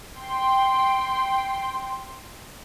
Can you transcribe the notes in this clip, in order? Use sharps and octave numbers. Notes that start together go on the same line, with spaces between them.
G5 C6